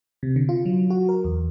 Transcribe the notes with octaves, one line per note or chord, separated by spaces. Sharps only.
C3
D3
F4
F#3
F#4
A#4
E2